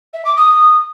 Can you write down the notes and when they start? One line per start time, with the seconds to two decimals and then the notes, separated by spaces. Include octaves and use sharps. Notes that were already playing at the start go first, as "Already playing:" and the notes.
0.13 E5
0.25 D6
0.36 D#6